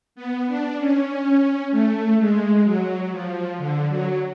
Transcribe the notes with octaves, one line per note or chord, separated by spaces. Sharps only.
B3
D4
C#4
A3
G#3
F#3
F3
D3
F#3